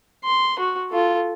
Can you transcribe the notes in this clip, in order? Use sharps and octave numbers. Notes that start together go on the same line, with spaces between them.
C6
F#4
F4 A4